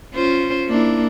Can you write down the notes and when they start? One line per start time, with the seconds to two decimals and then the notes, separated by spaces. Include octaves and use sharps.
0.14 C#4 F4 C5
0.68 A#3 D4 E4